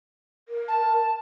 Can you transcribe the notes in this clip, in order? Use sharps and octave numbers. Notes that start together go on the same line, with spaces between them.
A#4
A5